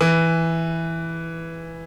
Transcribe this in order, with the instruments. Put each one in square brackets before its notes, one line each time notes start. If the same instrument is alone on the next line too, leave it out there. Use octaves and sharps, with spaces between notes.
[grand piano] E3